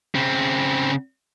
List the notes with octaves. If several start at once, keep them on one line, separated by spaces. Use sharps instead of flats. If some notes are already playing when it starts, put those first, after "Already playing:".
C#3 C4